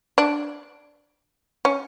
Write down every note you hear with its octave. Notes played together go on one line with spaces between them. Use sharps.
D4
C#4